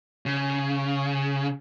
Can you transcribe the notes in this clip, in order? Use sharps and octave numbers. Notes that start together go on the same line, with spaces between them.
C#3